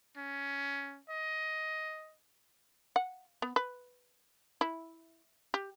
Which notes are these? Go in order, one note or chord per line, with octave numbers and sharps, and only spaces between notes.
C#4
D#5
F#5
B3
B4
E4
G4